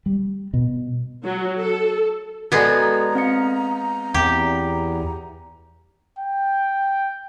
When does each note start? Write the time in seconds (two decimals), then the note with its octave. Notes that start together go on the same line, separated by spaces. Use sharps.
0.06 G3
0.53 B2
1.24 F#3
1.59 A4
2.52 G#3 B3 F#4 A4 D5 A#5
3.15 C4 F5 C#7
4.14 E2 G4
6.19 G5